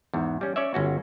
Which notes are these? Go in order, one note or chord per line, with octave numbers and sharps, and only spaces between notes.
E2 G#2
G3 C#4
C#4 C#5 D5 E5
G1 C#4 F#4